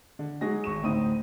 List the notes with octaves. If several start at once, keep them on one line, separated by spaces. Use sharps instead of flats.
D3
F#3 G#3 D#4 F#4 G#4 A#6
G#1 C#6 E7
D2 A2 C4 D#4 D#6 D#7